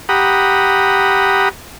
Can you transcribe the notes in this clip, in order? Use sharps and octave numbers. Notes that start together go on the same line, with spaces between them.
G4 F#5 A#5 B5 D#6